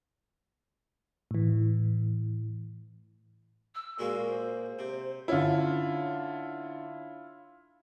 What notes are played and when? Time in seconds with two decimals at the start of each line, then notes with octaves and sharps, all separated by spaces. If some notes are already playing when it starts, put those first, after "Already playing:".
1.31 A2 E3
3.75 E6
3.99 A#2 G#3 A#3 F#4
4.27 C5
4.79 C3
5.28 D3 C#4 E4 F4